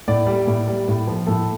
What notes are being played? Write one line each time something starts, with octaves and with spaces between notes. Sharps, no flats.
A2 D5
G3
A2
G3
A2
F3
A2 A4